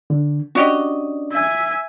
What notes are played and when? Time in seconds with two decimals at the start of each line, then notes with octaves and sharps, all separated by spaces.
0.10 D3
0.55 C#4 D4 F#4 G4 D5 D#5
1.32 E5 G#5